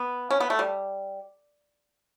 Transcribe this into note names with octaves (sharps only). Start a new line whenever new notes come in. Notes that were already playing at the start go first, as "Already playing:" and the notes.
Already playing: B3
C#4
B3
A3
G3